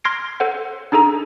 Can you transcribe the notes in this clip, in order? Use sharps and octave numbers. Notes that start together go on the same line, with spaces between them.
C6 F6 G#6 A#6 C7 D7
A4 C5 F#5
D4 D#4 G#4 A4 A#5